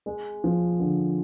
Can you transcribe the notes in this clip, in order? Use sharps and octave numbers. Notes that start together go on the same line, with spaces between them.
G#3
F3
D3